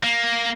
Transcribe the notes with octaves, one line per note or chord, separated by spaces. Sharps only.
A#3